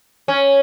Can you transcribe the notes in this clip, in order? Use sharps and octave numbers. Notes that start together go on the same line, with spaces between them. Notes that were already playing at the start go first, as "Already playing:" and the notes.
C#4